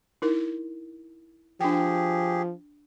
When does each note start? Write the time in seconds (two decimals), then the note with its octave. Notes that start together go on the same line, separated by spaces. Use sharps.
0.22 D#4 E4 A#4
1.61 F3 D4 G4 G#4 G5